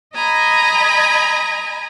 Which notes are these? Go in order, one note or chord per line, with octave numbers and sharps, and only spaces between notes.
D#5 G#5 A#5 B5